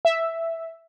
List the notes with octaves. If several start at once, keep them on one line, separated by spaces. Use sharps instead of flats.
E5